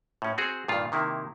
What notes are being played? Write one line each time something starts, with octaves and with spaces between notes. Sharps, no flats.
A2 C#4
C4 F#4 G#4
G2 A#2 D#3 F4
C3 D#3 A#3 E4